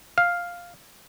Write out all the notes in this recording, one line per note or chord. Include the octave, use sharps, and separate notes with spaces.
F5